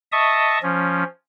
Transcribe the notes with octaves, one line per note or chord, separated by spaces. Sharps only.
D#5 E5 A5 C#6 D#6
F3 C#4